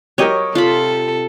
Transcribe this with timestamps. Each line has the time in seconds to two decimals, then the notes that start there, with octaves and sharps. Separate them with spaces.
0.18 F#3 G4 A#4 C#5 D#5
0.55 C3 F4 A4 B5